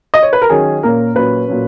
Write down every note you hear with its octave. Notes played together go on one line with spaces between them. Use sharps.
D#5
C#5
B4
A#4
D#3 F#3 C#4 G#4
A#2 A#3 C#4 A#4
A#2 F#3 C#4 B4
A#2 F#3 C#4